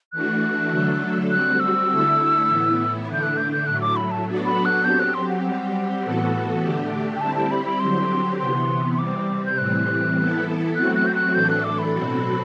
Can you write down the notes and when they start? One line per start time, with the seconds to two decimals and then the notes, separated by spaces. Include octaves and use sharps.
0.12 E3 A3 D4 F#4 F#6
0.71 D3 F#3 A3 D4 A4
1.31 G3 C4 F#4 F#6
1.60 E6
1.89 D3 A3 E4 A4
2.49 A2 E3 B3 E4
3.07 D3 A3 D4
3.14 G6
3.23 F#6
3.37 G6
3.52 G6
3.66 A2 F#3 A3 F#6
3.81 D6
3.96 B5
4.11 A5
4.26 F#3 B3 D4 F#4 A4
4.45 B5
4.65 F#6
4.84 F#3 C4 G4 G6
5.00 F#6
5.14 C6
5.29 F#5
5.44 G3 C4 G4 F#5
6.03 A2 E3 B3 F#4 A4
6.62 D3 A3 D4 G4
7.16 G5
7.21 G3 C4 E4 G4 A5
7.35 A5
7.51 B5
7.66 B5
7.80 D3 F#3 C4 G4 C6
8.39 C3 E3 B3 C6
8.94 C6
8.98 C3 G3 C4 D6
9.46 G6
9.57 A2 E3 G3 C4 F#6
10.17 E3 B3 E4 A4
10.75 F#3 A3 C4 F#4 F#6
10.95 F#6
11.06 G6
11.15 F#6
11.34 A2 E3 A3 D4 A4 G6
11.50 F#6
11.64 D6
11.79 B5
11.93 B2 F#3 C4 F#4 A4